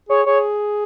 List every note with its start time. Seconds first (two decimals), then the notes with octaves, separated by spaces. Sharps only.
0.09 G#4 C#5
0.26 G#4 C#5